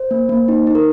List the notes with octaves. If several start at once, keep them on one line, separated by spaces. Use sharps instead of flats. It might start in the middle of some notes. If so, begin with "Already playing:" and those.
Already playing: C5
A#3
A#3
D#4
D#4
A#4